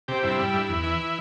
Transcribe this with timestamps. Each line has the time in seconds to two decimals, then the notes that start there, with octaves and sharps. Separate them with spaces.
0.08 C3 G4
0.23 G2 E4
0.39 G3
0.53 G2
0.69 E2
0.84 E3